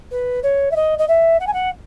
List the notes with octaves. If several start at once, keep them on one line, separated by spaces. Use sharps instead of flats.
B4
C#5
E5
D#5
D#5
E5
F#5
G#5
F#5